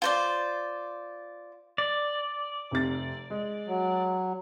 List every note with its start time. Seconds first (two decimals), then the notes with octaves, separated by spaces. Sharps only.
0.02 F4 C5 D5
1.78 D5
2.71 F1 C3 A6
3.30 G#3
3.67 F#3